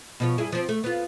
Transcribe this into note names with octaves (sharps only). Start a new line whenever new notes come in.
B2 F3 C#5
G2 E4 G#4
F3 C4
A3
B3 F4